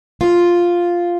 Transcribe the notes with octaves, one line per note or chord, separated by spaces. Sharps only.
F4